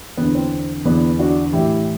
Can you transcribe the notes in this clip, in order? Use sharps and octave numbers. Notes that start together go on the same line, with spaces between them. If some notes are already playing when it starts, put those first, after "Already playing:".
E2 D3 B3
C4
E2 D3 B3 D4
D4 F#4
A2 E3 E4 G4